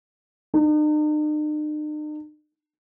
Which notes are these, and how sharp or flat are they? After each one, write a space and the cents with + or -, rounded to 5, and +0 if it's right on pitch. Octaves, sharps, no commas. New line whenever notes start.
D#4 -45